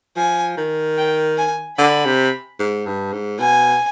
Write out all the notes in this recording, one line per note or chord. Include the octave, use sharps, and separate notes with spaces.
F3 G#5
D#3
G5
G#5
D3 B5
C3
G#2
G2
G#2
B2 G#5